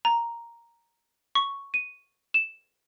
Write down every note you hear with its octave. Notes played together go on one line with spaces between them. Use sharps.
A#5
C#6
D#7
E7